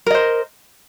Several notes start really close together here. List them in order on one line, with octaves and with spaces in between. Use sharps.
A#4 D#5 C5